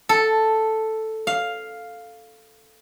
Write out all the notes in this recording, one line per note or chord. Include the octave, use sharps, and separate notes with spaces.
A4
F5